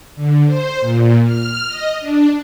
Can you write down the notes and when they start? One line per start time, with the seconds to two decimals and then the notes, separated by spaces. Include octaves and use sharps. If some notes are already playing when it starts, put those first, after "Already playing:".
0.16 D3
0.46 C5
0.80 A#2
1.24 F6
1.68 D#5
2.00 D4